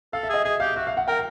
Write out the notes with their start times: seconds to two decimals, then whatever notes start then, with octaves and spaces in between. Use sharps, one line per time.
0.13 A4 F5
0.23 E5
0.30 G#4 D#5
0.45 G#4 E5
0.60 G4 F5
0.76 F#4 E5
0.87 F5
0.97 F#5
1.08 A#4 G5